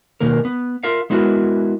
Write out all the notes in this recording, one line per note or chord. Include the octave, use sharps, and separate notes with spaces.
B2 D#3 A#3 A#4
B3
F4 A#4 E5 F5
G#3 B3 E4 F#4 A#4